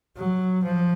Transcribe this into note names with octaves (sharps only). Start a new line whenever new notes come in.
F#3
F3